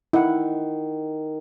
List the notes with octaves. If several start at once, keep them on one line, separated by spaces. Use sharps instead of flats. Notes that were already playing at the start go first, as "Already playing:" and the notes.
D#3 E4 F#5